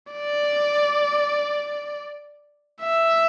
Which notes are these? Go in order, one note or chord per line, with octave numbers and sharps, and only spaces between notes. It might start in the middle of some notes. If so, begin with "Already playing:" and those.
D5
E5